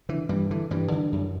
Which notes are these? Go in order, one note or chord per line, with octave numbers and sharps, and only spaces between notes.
D3 E3
G2 E3 G3
D3 E3
G2 E3 G3
D3
F#2